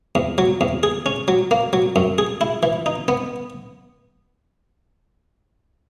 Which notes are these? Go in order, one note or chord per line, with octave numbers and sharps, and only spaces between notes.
E2
F#3
E2
G#4
C#4
F#3
A#3
F#3
F#2
G#4
E4
E3
D#4
B3